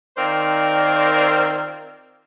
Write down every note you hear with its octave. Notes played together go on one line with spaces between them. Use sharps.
D#3 C4 F4 A#4 C5 D5